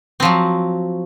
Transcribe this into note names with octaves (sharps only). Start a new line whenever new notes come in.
F3 F#3 C4